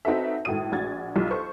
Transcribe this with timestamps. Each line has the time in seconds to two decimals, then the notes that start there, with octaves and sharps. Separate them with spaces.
0.05 C4 D#4 F#4 A4 B4 E5
0.45 G#1 A2 A3 F#4 D#6 D#7
0.72 A#1 F#4 G#6 A6
1.16 B1 G3 F4
1.31 A4 C5 C#6